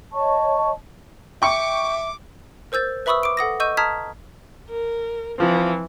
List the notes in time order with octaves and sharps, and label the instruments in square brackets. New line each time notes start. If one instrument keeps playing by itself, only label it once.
[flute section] C#5 D#5 A5 C#6
[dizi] E5 [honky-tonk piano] G5 C#6 C#7 [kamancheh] D6
[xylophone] A#4 C5 E6 G6 A6
B4 E5 B5 C#6 D#6 E6
D6 D7
A4 F#5 D#6 A#6
D#5 C#6 E6 G6 D#7
A5 A#5 D#6 F6 G#6 B6
[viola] A#4
[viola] E3 [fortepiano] F3 C4